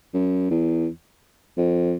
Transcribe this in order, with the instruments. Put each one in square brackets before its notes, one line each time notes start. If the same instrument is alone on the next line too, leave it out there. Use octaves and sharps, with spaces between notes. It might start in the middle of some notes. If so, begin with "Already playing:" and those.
[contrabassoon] F#2
E2
F2